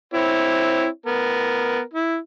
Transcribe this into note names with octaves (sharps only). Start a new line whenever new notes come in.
C4 E4 C#5
B3 A#4
E4